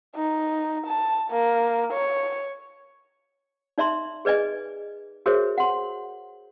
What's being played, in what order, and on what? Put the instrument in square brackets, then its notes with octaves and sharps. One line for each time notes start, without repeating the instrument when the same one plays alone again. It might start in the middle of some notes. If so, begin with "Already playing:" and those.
[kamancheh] D#4
A5
A#3
C#5
[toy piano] D#4 D5 E5 A#5 C6
G#4 B4 D5 D#5 G#5
F#4 G#4 A#4 C5 C#5 E5
F#5 C6